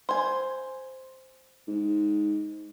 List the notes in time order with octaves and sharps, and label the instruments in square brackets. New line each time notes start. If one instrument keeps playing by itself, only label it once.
[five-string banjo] C5 G#5
[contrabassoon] G#2